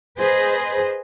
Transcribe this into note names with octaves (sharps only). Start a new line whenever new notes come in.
G#4 B4 C5 D#5